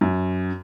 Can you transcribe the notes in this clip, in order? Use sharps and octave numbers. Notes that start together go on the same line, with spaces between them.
F#2